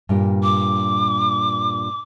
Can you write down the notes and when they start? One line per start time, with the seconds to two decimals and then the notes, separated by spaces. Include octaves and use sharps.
0.09 G2 A#2 G4
0.43 D6